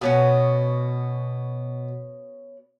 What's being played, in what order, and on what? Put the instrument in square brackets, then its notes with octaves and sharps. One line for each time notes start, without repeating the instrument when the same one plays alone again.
[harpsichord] B2 [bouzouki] B3 C#4 F#4